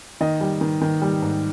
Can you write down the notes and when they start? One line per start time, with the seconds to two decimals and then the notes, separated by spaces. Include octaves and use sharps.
0.21 D#3 D#5
0.41 G3
0.61 D#3
0.81 D#3
1.02 G3
1.22 G#2